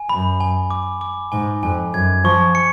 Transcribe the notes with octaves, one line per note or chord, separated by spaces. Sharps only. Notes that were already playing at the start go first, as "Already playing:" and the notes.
Already playing: G#5
F#2 B5
G#5
D6
D6
G#2 G#5
F2 G#5
F#2 G#6
F3 C#6
C#7